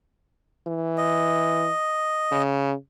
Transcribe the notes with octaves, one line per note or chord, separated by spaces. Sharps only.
E3
D#5
C#3